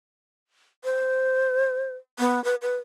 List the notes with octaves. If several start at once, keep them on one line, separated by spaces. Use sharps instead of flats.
C5
B3
B4
B4